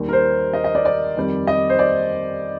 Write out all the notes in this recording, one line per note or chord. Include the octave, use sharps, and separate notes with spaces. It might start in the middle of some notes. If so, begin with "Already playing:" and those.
Already playing: D#2 D#3 G3
A#4
C5
D#5
D#5
D5
D5
F2 D#3 G3
D#5
C5
D5